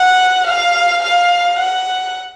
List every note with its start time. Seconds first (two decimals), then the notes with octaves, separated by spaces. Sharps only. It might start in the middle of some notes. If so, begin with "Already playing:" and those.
Already playing: F#5
0.47 F5
1.02 F5
1.59 F#5